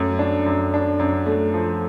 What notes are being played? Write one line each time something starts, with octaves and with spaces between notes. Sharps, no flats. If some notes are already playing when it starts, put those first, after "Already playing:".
Already playing: F#2 A3
D4
F#2
D4
F#2
A3
F3